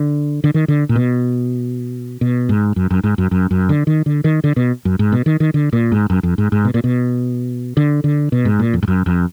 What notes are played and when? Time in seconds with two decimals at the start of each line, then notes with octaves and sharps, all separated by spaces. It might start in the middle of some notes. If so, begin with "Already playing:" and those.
Already playing: D3
0.44 D3
0.54 D#3
0.68 D3
0.89 A#2
0.96 B2
2.21 B2
2.49 G#2
2.76 F#2
2.91 F#2
3.04 G#2
3.18 F#2
3.31 F#2
3.51 F#2
3.69 D3
3.87 D#3
4.06 D3
4.24 D#3
4.44 D3
4.56 B2
4.85 F#2
4.99 G#2
5.12 B2
5.26 D#3
5.40 D#3
5.54 D3
5.73 A#2
5.92 G#2
6.10 F#2
6.23 F2
6.38 G#2
6.52 G#2
6.65 B2
6.74 A#2
6.84 B2
7.77 D3
8.04 D3
8.32 B2
8.45 G#2
8.59 A#2
8.73 F2
8.83 G#2
8.88 F#2
9.06 F2